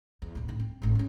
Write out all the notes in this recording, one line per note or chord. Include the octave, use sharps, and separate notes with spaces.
E2
D1 B1
A2 D#3
C4
G#1 D2
C4 C#4